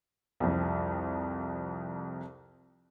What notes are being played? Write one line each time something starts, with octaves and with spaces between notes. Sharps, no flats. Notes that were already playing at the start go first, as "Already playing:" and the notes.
C2 F2